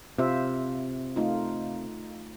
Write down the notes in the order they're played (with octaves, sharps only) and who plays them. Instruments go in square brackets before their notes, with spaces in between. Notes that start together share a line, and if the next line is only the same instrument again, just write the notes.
[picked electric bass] C3 [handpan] F4 C5 E5
[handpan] A3 D#4 F4